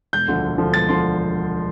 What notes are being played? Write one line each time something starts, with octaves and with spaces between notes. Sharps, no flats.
E1 G6
D2 D3 F3
E1
D2 D3 F3
E1 A6
D3 F3 C6